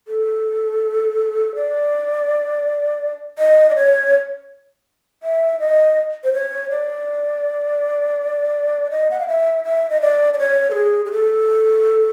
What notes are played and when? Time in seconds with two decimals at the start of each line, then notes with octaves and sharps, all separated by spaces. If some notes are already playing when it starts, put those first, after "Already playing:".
0.08 A4
1.55 D5
3.39 D#5
3.70 D5
3.76 C#5
5.23 E5
5.60 D#5
6.24 C5
6.34 C#5
6.70 D5
8.91 D#5
9.11 F#5
9.19 F5
9.28 E5
9.65 E5
9.90 D#5
10.01 D5
10.34 D5
10.39 C#5
10.71 A4
10.75 G#4
11.06 G#4
11.12 A4